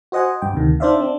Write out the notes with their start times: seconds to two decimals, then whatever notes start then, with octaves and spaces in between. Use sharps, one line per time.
0.12 F#4 C5 D#5 F#5 G#5
0.42 G2 G5
0.53 D2 C3 D#3
0.80 D4 D#4 C5 D5 E5 F5
1.00 C4 D4